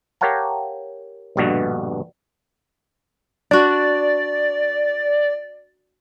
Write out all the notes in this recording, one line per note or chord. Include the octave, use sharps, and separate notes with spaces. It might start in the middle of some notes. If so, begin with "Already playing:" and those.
G4 A#4 C#5 F5 F#5 A5
A#1 G2 B2 D3 F#4
D4 F#4 D5